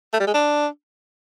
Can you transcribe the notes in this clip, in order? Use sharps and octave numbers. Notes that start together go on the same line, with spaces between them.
A3
G3
G#3
D4